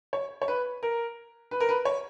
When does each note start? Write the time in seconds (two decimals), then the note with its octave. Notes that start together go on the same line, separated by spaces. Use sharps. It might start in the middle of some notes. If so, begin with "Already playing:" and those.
0.13 C#5
0.42 C#5
0.48 B4
0.83 A#4
1.51 B4
1.60 A#4
1.69 B4
1.85 C#5